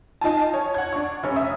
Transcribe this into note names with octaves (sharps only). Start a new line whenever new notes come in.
D#4 F4 G#5 A5
C#5
F#5 G#6
D4 C#6
F1 C#4
E5 D#6